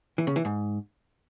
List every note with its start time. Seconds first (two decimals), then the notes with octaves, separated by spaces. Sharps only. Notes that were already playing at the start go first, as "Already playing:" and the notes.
0.18 E3
0.27 C#3
0.36 E3
0.45 G#2